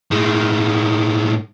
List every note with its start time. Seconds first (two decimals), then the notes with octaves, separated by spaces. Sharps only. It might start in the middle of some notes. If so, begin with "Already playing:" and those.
0.11 A2 G#3